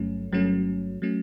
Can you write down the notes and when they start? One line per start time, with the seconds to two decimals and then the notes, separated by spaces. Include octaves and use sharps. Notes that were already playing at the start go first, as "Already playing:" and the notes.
Already playing: G1 G2 F#3 A3 C#4
0.32 G1 G2 F#3 A3 C#4
1.02 F#3 A3 C#4